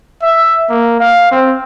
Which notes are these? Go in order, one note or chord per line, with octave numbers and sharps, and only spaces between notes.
E5
A#3
F5
C4